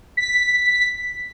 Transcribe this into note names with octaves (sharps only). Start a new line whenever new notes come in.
B6